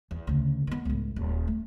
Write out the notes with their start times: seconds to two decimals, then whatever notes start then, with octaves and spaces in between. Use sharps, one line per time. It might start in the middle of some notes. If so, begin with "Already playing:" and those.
0.11 E2
0.27 D2 C#3
0.67 D#3 B3
0.85 C#2 A2
1.16 D#1
1.48 A3